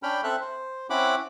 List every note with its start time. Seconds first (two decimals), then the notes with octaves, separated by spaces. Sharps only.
0.03 C#4 D4 G5 B5 F6
0.24 C4 A4 E5 F#6
0.41 C5
0.90 C4 C#4 E4 F#5 B5 D6